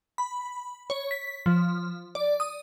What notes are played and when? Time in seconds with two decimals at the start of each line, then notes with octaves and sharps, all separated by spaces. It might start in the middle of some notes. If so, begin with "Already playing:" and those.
0.18 B5
0.90 C#5
1.11 B6
1.46 F3
2.15 D5
2.40 D#6